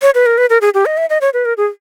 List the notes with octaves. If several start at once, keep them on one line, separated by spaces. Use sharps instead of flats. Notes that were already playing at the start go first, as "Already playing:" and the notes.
C#5
B4
A#4
B4
A#4
G#4
G4
D#5
E5
D#5
C#5
B4
A#4
G#4